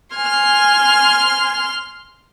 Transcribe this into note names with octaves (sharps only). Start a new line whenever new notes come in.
G#5 C6 F6